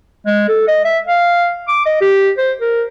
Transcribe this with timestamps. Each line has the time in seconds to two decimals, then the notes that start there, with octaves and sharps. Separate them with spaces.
0.26 G#3
0.48 A4
0.68 D#5
0.85 E5
1.07 F5
1.68 D6
1.86 D#5
2.01 G4
2.38 C5
2.60 A#4